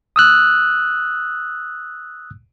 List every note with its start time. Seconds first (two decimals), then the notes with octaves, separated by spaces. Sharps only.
0.16 D#6 E6 F#6